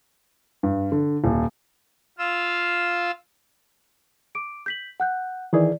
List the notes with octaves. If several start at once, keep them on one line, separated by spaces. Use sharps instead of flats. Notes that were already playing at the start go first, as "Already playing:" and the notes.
G2
D3
D#1
F4 F5 E6
D6 D7
G6 B6 F#7
F#5 F#6 G6
D#3 E3 E4 G#4 D5